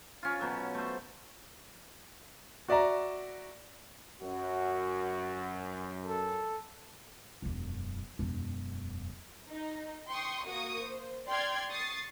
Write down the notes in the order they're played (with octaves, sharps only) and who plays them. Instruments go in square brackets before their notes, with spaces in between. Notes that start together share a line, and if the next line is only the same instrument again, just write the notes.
[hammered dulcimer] C#4 F4
B2 F#3 A4
A3 C5
[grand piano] F#4 D5 E5 A#5
[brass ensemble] F#2 [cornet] F#4
[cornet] A4
[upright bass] E1 F#2
E1 F#2
[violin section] D#4
G5 C6 C#6 D#6
A#3 F#4 C#6 D#6
C5
D5 G5 C6 F6 G#6
C#6 D#6 A6 C7